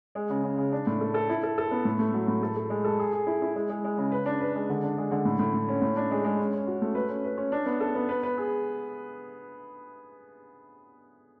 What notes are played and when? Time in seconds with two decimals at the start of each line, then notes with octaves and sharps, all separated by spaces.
0.15 G#3
0.30 C#3
0.43 C#3
0.58 C#3
0.72 D4
0.87 A2
1.01 A4
1.14 A4
1.29 E4
1.43 A4
1.58 A4
1.71 B3
1.85 A2
1.99 A3
2.14 F#3
2.28 A2
2.43 A4
2.56 A4
2.70 G#3
2.84 A4
2.99 G#4
3.12 G#4
3.27 E4
3.42 E4
3.56 G#3
3.69 G#3
3.84 G#3
3.98 C#3
4.12 B4
4.26 D4
4.41 B4
4.55 G#3
4.69 D3
4.83 D4
4.97 G#3
5.11 D3
5.25 A2
5.39 A2
5.54 A2
5.68 C#4
5.82 A2
5.96 D4
6.11 G#3
6.24 G#3
6.39 C#4
6.53 C#4
6.67 F#4
6.82 A3
6.95 B4
7.09 C#4
7.24 B4
7.38 C#4
7.52 D4
7.66 B3
7.80 A4
7.95 B3
8.09 B4
8.23 B4
8.38 G#4